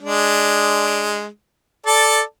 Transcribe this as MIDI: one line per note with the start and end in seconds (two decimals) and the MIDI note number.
0.01 1.26 56
0.01 1.26 62
1.86 2.21 69
1.86 2.21 74
1.86 2.21 81